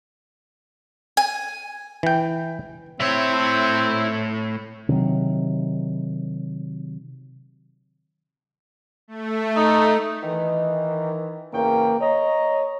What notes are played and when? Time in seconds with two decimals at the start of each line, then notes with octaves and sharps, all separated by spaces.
1.17 G#5
2.03 E3 G5
3.00 A2 C4 E4 C#5 E5
4.89 C3 D#3 F#3
9.08 A3
9.56 D#4
10.23 D#3 E3
11.53 E2 C#3 A#3 G5
12.01 C#5 D#5 A#5